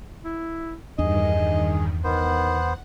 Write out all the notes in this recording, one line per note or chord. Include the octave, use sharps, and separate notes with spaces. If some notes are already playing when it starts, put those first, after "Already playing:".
E4
E2 G2 D#3 D4 G#4 D#5
D#3 B3 C5 F#5